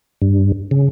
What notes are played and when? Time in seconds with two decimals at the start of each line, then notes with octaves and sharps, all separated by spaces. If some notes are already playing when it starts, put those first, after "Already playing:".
0.22 G2
0.71 C#3